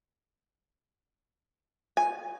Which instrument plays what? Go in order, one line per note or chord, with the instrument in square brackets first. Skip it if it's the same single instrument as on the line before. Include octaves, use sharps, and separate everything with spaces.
[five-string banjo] G#5